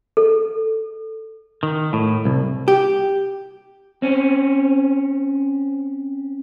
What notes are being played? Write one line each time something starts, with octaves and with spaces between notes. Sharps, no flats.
A4
D#3
A2
C2
G4
C4 C#4